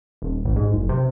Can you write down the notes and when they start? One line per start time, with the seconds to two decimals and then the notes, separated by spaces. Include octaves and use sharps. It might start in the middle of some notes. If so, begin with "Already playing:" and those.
0.22 D#1
0.44 A1
0.56 G#2
0.72 F#1
0.89 C3